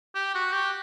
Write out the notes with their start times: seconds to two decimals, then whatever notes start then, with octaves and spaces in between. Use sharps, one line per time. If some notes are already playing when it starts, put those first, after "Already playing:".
0.15 G4
0.35 F#4
0.53 G4